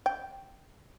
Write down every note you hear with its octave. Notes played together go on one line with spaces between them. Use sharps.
G5